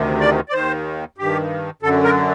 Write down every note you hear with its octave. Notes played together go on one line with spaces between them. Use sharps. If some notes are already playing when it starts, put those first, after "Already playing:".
Already playing: D2 C3 D#3
D5
D5
D#2 D#3 C5
G2 D#3 G4
F#2 D3 A4
A#4